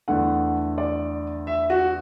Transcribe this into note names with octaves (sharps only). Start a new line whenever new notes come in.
E2 D3 A3 F#5
D5
E5
F#4